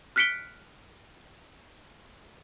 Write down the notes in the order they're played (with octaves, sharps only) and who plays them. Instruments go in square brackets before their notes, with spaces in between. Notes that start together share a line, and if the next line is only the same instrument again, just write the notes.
[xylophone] F6 F#6 B6 C#7 D7 G7